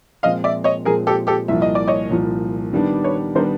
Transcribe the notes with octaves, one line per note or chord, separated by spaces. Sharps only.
A#2 F3 G#3 C4 D#5 F5
D5 E5
C#5 D#5
A#2 F3 G#3 C4 G#4 A#4
G4 A4
G4 A4
C2 A#2 F3 E5
D#5
D5
C#5 D#5
C2 A#2 F3
D#3 G3 B3 D4
B4 C#5
D#3 G3 B3 D4 A#4 C5